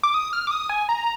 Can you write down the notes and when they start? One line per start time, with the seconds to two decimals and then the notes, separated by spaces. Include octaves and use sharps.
0.03 D6
0.14 D#6
0.33 F6
0.47 D6
0.51 D#6
0.69 G#5
0.89 A#5